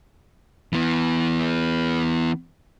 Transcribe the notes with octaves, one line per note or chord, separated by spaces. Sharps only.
E3 B3